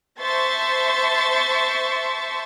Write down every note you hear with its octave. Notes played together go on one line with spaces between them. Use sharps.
C5 E5 A5 C6 C#6 A6